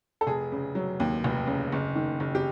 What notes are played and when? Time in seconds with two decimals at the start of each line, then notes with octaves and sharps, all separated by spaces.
0.21 A4
0.27 F1 G#4
0.52 C#3
0.75 F#3
1.00 D#2
1.24 F1
1.47 C#3
1.72 F#1
1.95 D#3
2.20 F#1
2.35 G4